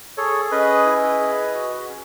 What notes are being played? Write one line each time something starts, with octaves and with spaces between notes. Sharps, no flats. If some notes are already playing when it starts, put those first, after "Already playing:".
G#4 A4 C#5
C#4 B4 D#5
E4
G#4
F#4
C#4